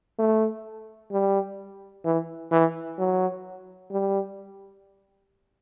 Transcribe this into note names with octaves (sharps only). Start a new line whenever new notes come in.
A3
G3
E3
E3
F#3
G3